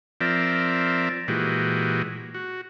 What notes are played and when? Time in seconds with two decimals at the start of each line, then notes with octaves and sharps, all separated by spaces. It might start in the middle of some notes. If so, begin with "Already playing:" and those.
0.21 F3 C4 A#4 D5 E5
1.28 A#2 E3 G#3 F#4 G4
2.34 F#4